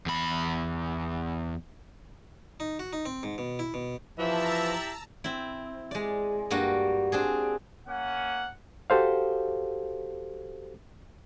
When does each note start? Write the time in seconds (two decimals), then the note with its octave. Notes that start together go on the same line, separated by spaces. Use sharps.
0.06 E2 B5
2.60 D#4
2.79 F#4
2.93 D#4
3.06 C4
3.23 G#2
3.38 B2
3.59 E4
3.74 B2
4.19 E3 F3 E4 G4 E5 A5 A#5 E6
5.24 C4 E4
5.91 G#3 D5
6.51 G2 G3 A#3 F#4
7.12 C4 D4 G#4
7.87 A#3 C#4 F#5
8.90 F#4 G4 A4 C5 F5